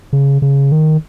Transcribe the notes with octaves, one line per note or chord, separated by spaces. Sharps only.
C#3
C#3
D#3